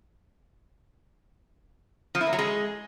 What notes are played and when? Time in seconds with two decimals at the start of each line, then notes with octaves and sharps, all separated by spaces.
2.15 F3
2.21 E4
2.27 A#3
2.33 F#3
2.39 G#3